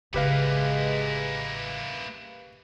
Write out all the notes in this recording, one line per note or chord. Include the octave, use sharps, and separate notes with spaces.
A1 C#3 G#3 A#3 E4 G4 B4 F5